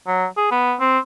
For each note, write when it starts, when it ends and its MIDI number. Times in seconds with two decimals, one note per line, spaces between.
0.07 0.26 54
0.37 0.51 68
0.51 0.74 59
0.80 0.99 60